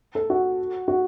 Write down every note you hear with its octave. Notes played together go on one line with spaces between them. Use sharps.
A4
F#4
F#4